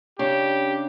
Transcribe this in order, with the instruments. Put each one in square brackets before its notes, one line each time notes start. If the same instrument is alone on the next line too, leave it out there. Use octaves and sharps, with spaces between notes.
[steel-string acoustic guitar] C#3 D4 [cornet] G4